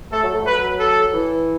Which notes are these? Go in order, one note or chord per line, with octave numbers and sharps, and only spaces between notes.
A3 A4
F#3
A3
F#3 B4
A4
E3